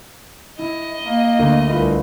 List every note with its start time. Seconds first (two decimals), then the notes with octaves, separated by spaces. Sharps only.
0.59 E4 D#5
1.03 A#3
1.39 D2 F#4 A#4
1.69 C2 F4 B4 F5